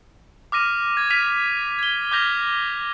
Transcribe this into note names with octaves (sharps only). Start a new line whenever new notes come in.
D6 F6 A#6 D#7
G#6
F6 G#6 A#6 B6 D#7 F7
G#6 G7
D6 F6 G6 A#6 F7